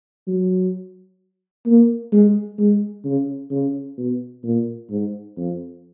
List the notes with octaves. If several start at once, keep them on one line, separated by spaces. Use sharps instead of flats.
F#3
A#3
G#3
G#3
C#3
C#3
B2
A#2
G#2
F2